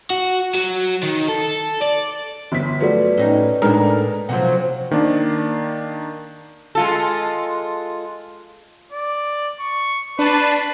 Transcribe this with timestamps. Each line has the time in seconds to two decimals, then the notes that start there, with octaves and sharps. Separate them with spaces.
0.10 F#4
0.55 F#3
1.03 D#3
1.28 A4
1.82 D5
2.52 G1 B6
2.81 F3 F#3 A3 B4 D5
3.17 A2 C#4 D#4
3.62 A2 G#3 D4 D#4 A#4
4.29 C3 F3 F#3 F#5
4.91 D#3 A#3 D4
6.75 G#3 F4 A4
8.92 D5
9.60 C#6
10.19 D4 B4 A5 C7